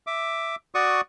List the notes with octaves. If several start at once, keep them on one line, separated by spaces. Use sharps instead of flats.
E5 D6
F#4 D5 C#6 D#6